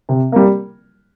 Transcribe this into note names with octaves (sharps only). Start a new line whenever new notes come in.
C3
G3 A#3